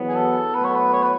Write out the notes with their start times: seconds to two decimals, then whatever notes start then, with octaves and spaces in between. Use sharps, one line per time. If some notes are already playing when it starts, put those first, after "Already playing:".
Already playing: E2 B2 F#3 B3
0.08 G#4
0.15 A4
0.53 A2 F#3 B3 B4
0.64 C#5
0.75 B4
0.93 C#5
1.03 B4